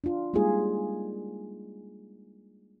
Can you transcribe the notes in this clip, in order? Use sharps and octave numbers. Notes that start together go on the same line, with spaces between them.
D4 F4
G3 G#3 A#3 D#4 F4 G#4